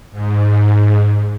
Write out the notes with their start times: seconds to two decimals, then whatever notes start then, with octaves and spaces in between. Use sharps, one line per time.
0.12 G#2